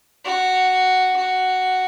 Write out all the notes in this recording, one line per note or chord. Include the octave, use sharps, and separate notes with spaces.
F#4
F#4